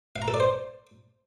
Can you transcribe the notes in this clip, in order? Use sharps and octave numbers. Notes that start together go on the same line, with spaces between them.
F5
A#5
A4
D5
C5